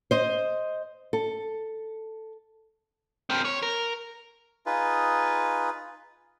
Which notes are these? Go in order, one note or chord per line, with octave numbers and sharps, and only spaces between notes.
C5 D#5
A4
C4 A#4
C#5
A#4
D#4 F4 G#4 B4